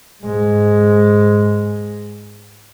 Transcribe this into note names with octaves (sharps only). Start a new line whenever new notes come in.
G#2 G#3